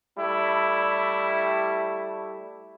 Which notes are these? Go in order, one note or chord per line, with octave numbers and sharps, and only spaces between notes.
G3 A3 E4